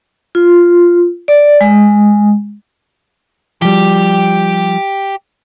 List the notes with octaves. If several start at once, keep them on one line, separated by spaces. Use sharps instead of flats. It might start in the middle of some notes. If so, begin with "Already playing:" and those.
F4
D5
G#3
F3 G3 G4